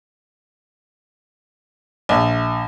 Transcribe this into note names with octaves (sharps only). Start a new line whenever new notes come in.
A#1